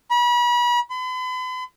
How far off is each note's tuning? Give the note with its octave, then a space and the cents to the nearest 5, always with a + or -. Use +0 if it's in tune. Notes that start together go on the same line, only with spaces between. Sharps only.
B5 -35
B5 +45